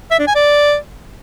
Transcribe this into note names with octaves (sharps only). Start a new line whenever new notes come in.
E5
D4
G#5
D5